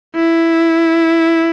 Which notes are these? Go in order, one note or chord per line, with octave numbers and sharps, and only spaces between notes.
E4